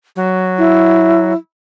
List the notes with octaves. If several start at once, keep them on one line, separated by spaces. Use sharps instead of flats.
F#3
E4